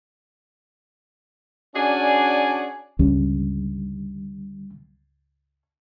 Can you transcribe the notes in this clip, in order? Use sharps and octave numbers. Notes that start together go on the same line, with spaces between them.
C#4 D4 F#4 G#4 D5 G#5
C#2 G2 D3 G3 C#4